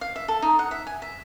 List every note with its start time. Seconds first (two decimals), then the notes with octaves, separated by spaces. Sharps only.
0.01 F5
0.16 E5
0.28 A4
0.42 D#4
0.59 F#5
0.71 E5
0.87 G#5
1.02 E5